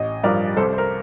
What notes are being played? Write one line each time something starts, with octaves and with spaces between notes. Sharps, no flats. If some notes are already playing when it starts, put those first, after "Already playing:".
Already playing: A1 D#5
G2 F3 A#4 D5
C2 A4 C5
C5
A#4